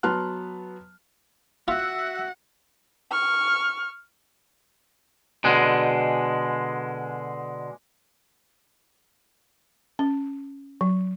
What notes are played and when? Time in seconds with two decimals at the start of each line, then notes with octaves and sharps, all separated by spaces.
0.03 F#3 B3 A5 C6 F6 F#6
1.68 F4 F#4 E5 F#5
3.12 C#6 F6
5.44 B2 D3 G#3
9.99 C#4
10.81 F#3